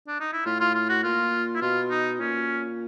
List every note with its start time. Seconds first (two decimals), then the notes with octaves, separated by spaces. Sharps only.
0.08 D4
0.20 D#4
0.33 E4
0.46 A2 F4
0.61 F4
0.75 F4
0.89 F#4
1.04 A#2 F4
1.55 E4
1.61 B2 F4
1.91 D#4
2.19 A#2 C#4